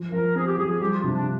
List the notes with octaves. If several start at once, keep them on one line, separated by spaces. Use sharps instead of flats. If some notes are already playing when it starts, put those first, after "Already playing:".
Already playing: F3
F3 A#4
C4 G#4
G4
F3 G#4
G#4
G3 G4
F4
C3 D4
D4